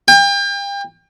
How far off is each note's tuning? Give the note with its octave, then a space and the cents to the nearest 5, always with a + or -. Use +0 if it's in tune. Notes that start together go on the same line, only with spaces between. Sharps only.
G5 +35